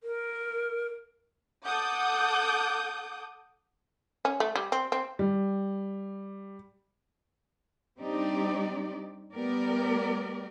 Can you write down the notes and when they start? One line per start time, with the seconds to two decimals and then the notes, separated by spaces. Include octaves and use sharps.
0.04 A#4
1.65 A4 F#5 D6 D#6 G6
4.25 C#4
4.40 A3
4.55 G3
4.72 C4
4.92 C4
5.19 G3
7.99 G3 C4 D4 D#4 G4 D5
9.34 G3 A3 B3 G4 A#4 D5